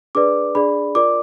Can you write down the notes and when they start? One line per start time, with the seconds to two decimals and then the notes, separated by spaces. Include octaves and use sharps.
0.15 D4 G#4 B4 D5 D6
0.55 D4 G#4 D5 B5
0.95 F4 A#4 D5 D6